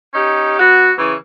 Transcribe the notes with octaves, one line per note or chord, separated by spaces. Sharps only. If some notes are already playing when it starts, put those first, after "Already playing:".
C#4 D#4 G4
B3 F#4
C#3 E3